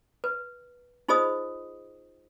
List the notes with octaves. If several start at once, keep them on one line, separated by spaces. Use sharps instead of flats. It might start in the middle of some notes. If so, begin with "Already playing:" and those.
B4
D#4 F4 G#4 C5 D#5 D#6